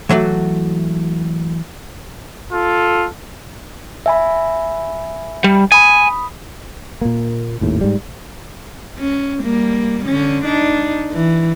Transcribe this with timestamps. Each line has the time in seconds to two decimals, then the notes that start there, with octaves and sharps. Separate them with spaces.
0.09 E3 F#3 A3 F#4
2.51 F4 A4
4.06 E5 G#5 B5
5.44 G3
5.72 G#5 B5 D#6
7.01 A#2 A#3
7.61 G#1 D#2 A2
7.81 G#2 G3
8.98 C#4
9.43 G3 A#3
10.05 D3 C#4
10.45 D4 D#4
11.12 E3